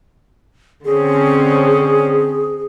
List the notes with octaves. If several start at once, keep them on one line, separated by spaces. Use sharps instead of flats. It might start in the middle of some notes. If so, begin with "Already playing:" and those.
D3 C4 C#4 G#4